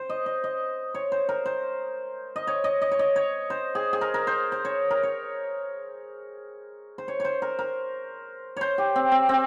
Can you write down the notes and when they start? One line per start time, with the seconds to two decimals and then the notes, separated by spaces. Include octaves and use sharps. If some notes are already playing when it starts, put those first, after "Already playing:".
Already playing: C5
0.10 D#5
0.26 D#5
0.44 D#5
0.95 C#5
1.12 C5
1.29 A#4
1.46 C5
2.36 D#5
2.47 C#5
2.64 D#5
2.82 D#5
2.92 C#5
2.99 D#5
3.16 C#5
3.50 C5
3.75 G#4
3.93 G#4
4.01 A#4
4.14 A#4
4.27 C5
4.52 C5
4.65 C#5
4.91 A#4
5.03 C#5
6.98 C5
7.08 C#5
7.20 C5 C#5
7.42 A#4
7.59 A#4
8.57 C5 C#5
8.78 G4
8.96 C4
9.12 C4
9.29 C4